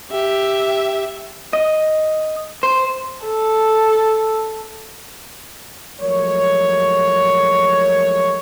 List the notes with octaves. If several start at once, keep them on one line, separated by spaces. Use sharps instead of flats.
G4 E5
D#5
C5
A4
F3 F#3 G#3 A3 A#4 C#5